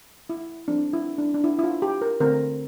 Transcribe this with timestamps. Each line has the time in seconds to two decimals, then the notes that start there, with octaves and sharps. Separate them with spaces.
0.29 E4
0.68 F3 C4 D4
0.93 E4
1.18 D4
1.34 D4
1.44 E4
1.59 E4
1.63 F4
1.82 G4
2.02 A#4
2.20 D3 A3 C4 A#4